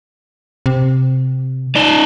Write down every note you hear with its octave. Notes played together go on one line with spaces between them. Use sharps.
C3
D#4 D5